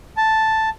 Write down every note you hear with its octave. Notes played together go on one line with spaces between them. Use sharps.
A5